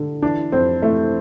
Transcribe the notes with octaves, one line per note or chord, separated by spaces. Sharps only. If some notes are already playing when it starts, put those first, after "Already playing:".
Already playing: D3
E3 D4
F2 C4
E3 A3